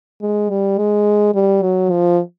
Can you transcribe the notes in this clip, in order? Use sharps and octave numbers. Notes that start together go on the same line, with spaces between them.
G#3
G3
G#3
G3
F#3
F3